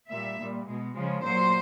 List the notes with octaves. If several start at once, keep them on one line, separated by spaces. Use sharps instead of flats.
A#2 G3 E5
A#2 G3
B2 G#3
C#3 F3 G#3
A#2 F#3 C5